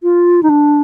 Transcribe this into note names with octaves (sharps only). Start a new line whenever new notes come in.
F4
D#4
D4